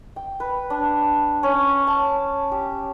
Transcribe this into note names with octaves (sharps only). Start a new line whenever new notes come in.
G5
B4
D4
C#4
A5
G4